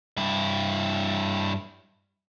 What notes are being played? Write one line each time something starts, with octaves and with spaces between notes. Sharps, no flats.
G2 E4